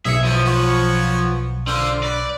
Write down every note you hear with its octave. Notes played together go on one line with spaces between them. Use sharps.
B1 G#4 E5 C#7
F3 B3 E4
B3 F#4 C#5
D3 F4 C5
B4 D5